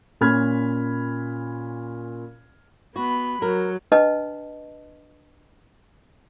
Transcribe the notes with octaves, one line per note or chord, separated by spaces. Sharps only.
A#2 C#4 B5 F6 G#6
B3 F#4 B5
F#3 A#4
D4 B4 D#5 A5